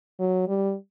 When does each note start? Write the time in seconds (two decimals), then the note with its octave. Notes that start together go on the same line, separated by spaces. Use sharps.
0.19 F#3
0.48 G3